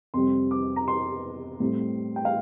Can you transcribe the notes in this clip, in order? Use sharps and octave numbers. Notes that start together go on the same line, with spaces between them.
F2 C3 G3 C4 C6
D6
A#5
C6
A2 G3 C4
G5
F5